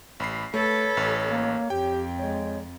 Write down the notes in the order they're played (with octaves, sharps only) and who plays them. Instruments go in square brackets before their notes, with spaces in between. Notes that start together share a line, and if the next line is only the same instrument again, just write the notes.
[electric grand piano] A1 B5 C7
[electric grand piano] A3 [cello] A4 B4 [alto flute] C#5
[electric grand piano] A1
[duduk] A#3
[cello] F2 [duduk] G4 [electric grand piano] G5
[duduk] G#3 [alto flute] C#5